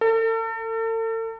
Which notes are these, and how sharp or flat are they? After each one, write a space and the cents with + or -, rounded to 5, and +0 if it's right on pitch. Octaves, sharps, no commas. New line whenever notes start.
A4 +40